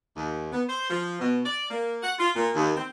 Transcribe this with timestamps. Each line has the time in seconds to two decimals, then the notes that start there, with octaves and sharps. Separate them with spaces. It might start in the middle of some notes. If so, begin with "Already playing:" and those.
0.17 D#2
0.52 B3
0.68 C5
0.90 F3
1.20 B2
1.45 D5
1.71 A#3
2.03 F#5
2.19 F4
2.35 A#2
2.55 D#2
2.77 C4